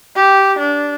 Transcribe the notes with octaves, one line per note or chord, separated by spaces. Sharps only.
G4
D4